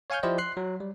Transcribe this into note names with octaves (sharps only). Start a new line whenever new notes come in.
C#5 F5 G#5 C#6 F6 G6
F3 E4 G4 C5 D5 D#5
C6 F#6 C7
F#3
G3